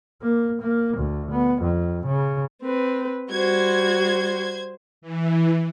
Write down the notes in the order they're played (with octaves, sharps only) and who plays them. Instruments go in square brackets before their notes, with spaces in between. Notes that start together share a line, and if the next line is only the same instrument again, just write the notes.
[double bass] A#3
A#3
D2
B3
F2
C#3
[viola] C4 B4
[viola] G3 F#4 [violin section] C5 G#6
[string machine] E3